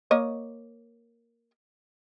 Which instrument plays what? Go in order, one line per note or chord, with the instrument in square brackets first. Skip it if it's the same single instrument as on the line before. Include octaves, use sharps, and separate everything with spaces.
[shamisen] A#3 C#5 D#5